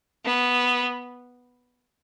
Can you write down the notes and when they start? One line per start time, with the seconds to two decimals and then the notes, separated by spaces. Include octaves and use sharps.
0.25 B3